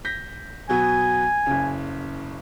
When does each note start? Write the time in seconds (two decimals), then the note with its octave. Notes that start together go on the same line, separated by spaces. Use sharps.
0.05 G6 A#6 B6
0.69 B2 F#3 B3 G#5
1.46 F#1 C#3